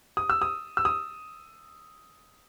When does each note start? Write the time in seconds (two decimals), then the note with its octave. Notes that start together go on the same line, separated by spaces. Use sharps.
0.17 D#6
0.30 E6
0.42 D#6
0.77 E6
0.85 D#6